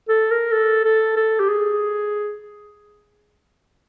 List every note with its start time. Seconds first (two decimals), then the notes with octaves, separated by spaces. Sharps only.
0.09 A4
0.31 A#4
0.52 A4
0.85 A4
1.17 A4
1.40 G4
1.49 G#4